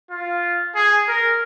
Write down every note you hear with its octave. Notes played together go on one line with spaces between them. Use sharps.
F4
G#4
A#4